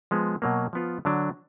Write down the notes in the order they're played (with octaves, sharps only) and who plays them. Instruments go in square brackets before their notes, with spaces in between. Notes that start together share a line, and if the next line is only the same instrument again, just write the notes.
[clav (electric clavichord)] F3 G#3 B3
B2 F#3 A#3
F3 B3 F4
D3 F#3 D4